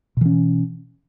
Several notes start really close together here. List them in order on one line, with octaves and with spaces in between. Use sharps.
B2 E3 C#4